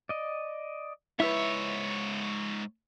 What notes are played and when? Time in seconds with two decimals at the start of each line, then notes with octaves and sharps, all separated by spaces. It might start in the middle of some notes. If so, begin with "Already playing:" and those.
0.09 D5 D#5
1.20 G#2 E4 B4 C#5 E5 E6